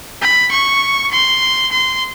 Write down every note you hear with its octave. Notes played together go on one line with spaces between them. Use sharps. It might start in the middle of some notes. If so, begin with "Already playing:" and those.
B5
C#6
C6
C6